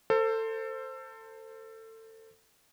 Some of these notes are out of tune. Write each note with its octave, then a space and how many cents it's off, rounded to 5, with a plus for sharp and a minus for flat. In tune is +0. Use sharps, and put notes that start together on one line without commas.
A4 +25 C5 +0